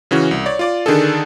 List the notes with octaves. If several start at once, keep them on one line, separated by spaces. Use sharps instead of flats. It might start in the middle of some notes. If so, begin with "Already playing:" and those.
C#3 E3 C#4 F#4
C2
C#5 D5
F4 D5 D6
D3 D#3 D4 G#4 A4